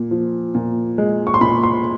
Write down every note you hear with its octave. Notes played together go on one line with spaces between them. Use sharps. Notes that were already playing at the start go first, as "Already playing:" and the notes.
Already playing: A#2
F3
A#2
G#3
C#6
C6
A#2 B5
C6